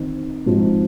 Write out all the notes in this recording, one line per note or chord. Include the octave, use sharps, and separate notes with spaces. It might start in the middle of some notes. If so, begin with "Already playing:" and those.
Already playing: D#3 C4 D#4
G#2 F3 C4 D#4